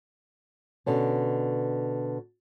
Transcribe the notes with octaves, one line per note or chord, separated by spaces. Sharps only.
B2 D3 C#4